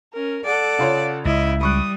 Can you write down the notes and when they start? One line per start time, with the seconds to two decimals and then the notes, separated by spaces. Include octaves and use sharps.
0.13 C#4 A#4
0.45 A4 D5 F#5
0.79 C#3 F4 C#5
1.25 C#2 E4 D#5
1.61 G3 B5 C#6 D#6 F#6